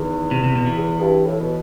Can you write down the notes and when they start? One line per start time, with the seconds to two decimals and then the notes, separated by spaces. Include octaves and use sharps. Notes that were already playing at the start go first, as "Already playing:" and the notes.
Already playing: E2 D#3
0.31 C3
0.44 C3
0.55 B2
0.66 E3
0.78 E2
1.01 G2
1.25 A2
1.40 B2